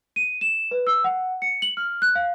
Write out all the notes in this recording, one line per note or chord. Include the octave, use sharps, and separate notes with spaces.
D#7
E7
B4
E6
F#5
C#7
F#7
F6
F#6
F5